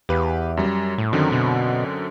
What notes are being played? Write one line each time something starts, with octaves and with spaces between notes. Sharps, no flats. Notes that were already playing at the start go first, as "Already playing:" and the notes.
E2 G4 B4 F5
F#2 G3
A2
F#2 D3 D#3 C4
B2